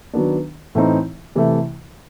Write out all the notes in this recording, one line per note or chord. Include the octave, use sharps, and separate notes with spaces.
D#3 F#3 B3 D4
A2 E3 A3 C4 D#4
C3 E3 A3